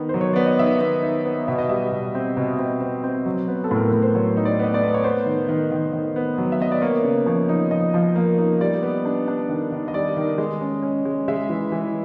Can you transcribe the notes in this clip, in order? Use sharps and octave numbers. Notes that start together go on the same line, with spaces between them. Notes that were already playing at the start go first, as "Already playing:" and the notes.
Already playing: D#3 B3
F#3 C5
C#5
B3 D5
D#5
D#3 E5
B3
D#4
B3
B2 E5
D#5
G3 E5
B2
C4
B2
C4
C4
C4
F#3
B3
A4
A2
A#4
A2 B4
C5
F#3 C#5
D#4
D5
B3 D#5
D5
B3
C#5
B3 C5
D#3
D#3
D#3
D#3
B3
F#3
E5
B3 D#5
D5
A#3 C#5
C#3
F3 C#5
D#4
F3 D#5
F3
A#3
D#4
G3 D5
B3
D4
D4
D#3
D#3
D#5
G3 D5
D#3
G#3 D#5
C#4
C#4
G#3
G#3 E5
E3
E3